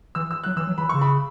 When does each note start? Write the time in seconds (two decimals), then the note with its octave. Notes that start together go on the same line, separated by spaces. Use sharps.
0.15 E3 E6
0.31 E6
0.44 F#3 F#6
0.57 E3 E6
0.67 F#3
0.78 E3 B5
0.89 C#3 C#6
1.02 B5